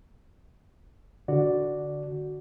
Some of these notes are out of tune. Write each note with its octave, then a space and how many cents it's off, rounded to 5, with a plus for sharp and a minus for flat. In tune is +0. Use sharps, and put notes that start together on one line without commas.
D3 +0 F#4 +0 D5 +0